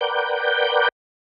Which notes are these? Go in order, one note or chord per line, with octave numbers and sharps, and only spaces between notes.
A#4 B4 D5 F#5 G5 G6